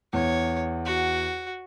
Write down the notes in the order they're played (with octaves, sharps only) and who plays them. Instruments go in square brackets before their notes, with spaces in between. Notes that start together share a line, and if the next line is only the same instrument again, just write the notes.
[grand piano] E2 [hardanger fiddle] C#5
[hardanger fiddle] F#4